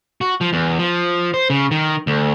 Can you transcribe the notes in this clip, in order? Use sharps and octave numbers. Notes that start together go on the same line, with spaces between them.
F#4
F3
E2
F3
C5
C#3
D#3
D2